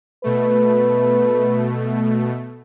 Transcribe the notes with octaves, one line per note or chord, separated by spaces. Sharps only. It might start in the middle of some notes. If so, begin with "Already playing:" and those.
B2 A3 B4